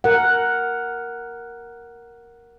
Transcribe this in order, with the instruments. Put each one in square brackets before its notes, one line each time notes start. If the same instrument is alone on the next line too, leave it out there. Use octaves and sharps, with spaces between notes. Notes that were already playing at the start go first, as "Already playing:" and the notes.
[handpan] A#4 F#5